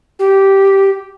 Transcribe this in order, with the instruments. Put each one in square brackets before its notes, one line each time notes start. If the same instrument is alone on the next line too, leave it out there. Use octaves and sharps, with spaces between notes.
[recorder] G4